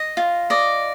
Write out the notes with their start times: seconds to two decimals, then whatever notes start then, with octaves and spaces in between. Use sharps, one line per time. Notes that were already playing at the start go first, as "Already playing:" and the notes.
Already playing: D#5
0.17 F4
0.50 D5 D#5